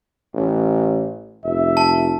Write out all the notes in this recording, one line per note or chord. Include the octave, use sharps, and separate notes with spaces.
A1
F1 E5
A5